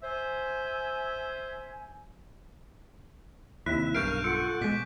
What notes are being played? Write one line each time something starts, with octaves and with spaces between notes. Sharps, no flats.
C5 E5 G#5
D#2 C3 E4 E5 F#6
B1 G2 A#4 F5 C#6 F6 G6 D7
F4 A4 F#5
B2 G#3 D6 B6